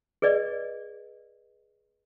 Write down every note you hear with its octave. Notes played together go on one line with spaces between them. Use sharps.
G#4 B4 D5 D#5